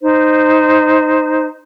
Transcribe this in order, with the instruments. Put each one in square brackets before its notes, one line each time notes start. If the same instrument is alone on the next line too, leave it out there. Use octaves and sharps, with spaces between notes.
[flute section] D#4 C5